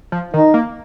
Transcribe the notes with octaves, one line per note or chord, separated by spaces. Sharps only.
F3
D#3 D#4
A#3